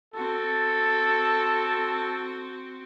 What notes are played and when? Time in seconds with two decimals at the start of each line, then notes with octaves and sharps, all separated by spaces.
0.14 C4 F#4 A4